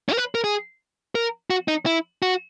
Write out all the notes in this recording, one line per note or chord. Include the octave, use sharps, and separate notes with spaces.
C#4
A#4
B4
A#4
G#4
A#4
F#4
D#4
E4
F#4